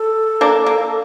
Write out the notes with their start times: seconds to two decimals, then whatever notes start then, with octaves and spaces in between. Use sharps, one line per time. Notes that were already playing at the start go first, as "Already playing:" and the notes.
Already playing: A4
0.41 A#3 D4
0.66 A#3